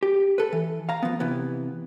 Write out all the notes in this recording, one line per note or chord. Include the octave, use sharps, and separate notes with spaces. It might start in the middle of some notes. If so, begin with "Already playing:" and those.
G4
A4 B4
E3
F5 A#5
F3 B3
C3 E3 B3